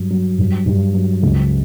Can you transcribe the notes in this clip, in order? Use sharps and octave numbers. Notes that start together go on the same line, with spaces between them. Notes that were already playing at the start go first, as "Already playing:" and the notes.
Already playing: G2 F#3
F#3
G2
G2
F#3
C#2